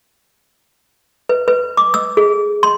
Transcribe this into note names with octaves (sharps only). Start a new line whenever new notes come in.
B4
B4
D6
E6
G#4
C6